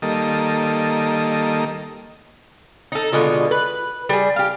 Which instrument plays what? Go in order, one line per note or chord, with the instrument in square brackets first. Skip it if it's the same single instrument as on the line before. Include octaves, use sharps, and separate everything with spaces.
[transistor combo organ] D#3 G3 A#3 A4 D#5
[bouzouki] D#4 A4
B2 D3 G#3 F4
B4
G3 G#4
G4 F5